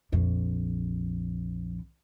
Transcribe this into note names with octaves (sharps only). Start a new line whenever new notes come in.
A#1 F2